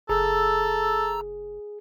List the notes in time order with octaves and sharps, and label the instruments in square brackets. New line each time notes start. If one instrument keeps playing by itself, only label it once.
[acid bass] F#1 [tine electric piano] G#4 [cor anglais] A4 [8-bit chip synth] A#5 E6